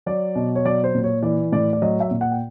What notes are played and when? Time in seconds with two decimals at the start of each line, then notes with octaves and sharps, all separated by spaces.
0.06 F#3 D5
0.36 B2
0.55 C#5
0.65 F#3 D5
0.84 C5
0.95 A#2
1.04 C#5
1.23 E3 D5
1.52 A2 D5
1.73 D5
1.82 F#3 D#5
2.00 E5
2.11 A#2
2.21 F#5
2.32 G5